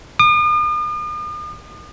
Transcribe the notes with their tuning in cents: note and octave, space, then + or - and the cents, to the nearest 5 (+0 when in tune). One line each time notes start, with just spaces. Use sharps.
D#6 -45